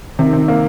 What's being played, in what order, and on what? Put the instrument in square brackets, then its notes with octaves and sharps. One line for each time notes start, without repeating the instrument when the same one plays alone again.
[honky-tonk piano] C3 [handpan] D#3
[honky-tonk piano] C3
A#3